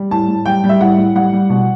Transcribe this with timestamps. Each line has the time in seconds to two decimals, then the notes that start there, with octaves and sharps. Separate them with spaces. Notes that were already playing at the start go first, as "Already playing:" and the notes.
Already playing: G3
0.11 A2 A5
0.28 A2
0.46 G3 G5
0.64 G3
0.69 E5
0.81 A2 F#5
0.98 A2
1.15 G3 F#5
1.33 G3
1.50 B2